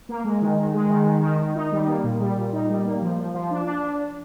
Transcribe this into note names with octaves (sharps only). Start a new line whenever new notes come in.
A#3
G#3
D#3
D#3
G#3
D#3
D#3
D#3
D#3
D#4
G3
A#3
A#2
G3
A#2
D#4
G3
A#3
F3
F3
F3
D4
D4